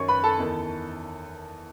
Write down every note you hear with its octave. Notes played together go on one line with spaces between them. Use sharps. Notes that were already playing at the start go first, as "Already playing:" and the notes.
Already playing: F#2 D#3 C#5 C#6
B4 B5
A4 A5
E2 D#3